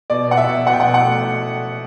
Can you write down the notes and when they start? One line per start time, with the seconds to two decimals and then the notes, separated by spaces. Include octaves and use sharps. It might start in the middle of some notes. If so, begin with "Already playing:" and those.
0.10 B2 D5
0.28 B2 F#5
0.37 E5
0.47 B2
0.66 B2 F#5
0.73 G5
0.80 F#5
0.85 B2
0.94 F#5
1.04 A3